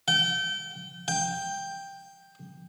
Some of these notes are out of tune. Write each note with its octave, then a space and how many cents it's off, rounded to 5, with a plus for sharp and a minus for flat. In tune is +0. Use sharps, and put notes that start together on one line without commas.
G5 -30
G5 +10